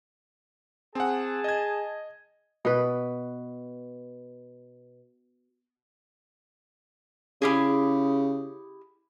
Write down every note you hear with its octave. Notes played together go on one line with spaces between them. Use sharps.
C4 G#4 F#5 A5
D#5 G#6
B2 B4
C#3 E4 G4 G#4